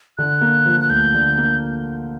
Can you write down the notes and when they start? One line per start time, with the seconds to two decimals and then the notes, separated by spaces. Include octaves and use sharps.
0.18 D3 F#6
0.41 A#3
0.66 F3
0.80 F#6
0.90 D2 G6
1.14 D3
1.38 A#3